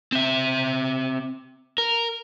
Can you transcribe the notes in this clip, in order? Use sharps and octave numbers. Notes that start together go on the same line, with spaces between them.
C4 E5
A#4